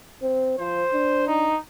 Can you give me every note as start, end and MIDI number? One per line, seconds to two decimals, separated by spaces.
0.22 0.56 60
0.59 0.83 53
0.59 1.23 72
0.93 1.51 62
1.27 1.57 63